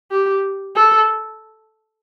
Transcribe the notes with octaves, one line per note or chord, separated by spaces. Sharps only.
G4
A4